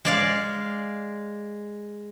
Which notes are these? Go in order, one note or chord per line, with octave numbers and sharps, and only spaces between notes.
G#3 D5 F5